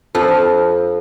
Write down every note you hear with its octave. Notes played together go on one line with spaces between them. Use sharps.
F2 F3